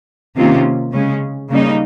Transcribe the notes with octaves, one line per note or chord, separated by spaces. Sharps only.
C3 D#3 A#3 C#4 F4
C#3 G#3 C#4
C#3 G3 A#3 D#4